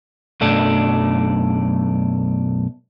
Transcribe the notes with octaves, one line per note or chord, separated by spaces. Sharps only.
B1 F#2 A3 D4